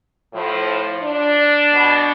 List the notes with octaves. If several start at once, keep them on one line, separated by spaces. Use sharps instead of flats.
A2 F3
D4
B2